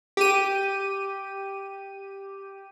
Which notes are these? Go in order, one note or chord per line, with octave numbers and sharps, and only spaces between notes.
G4 D#7